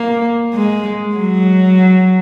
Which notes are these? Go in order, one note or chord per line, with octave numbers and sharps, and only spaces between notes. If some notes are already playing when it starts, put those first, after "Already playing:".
Already playing: A#3
G#3
F#3